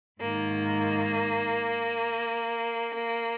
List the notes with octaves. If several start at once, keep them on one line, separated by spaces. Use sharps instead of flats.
G#2 D#3 A#3